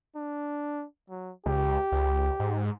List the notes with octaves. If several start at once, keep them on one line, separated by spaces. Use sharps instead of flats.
D4
F#3
C#2 G4
C#2
G#2